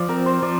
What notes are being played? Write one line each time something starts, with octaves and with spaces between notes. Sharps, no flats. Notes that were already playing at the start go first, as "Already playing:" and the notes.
Already playing: F3 D5
C4 A#4
C5
F3 D5